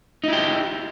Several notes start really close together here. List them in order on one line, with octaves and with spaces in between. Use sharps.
D#4 E4 G4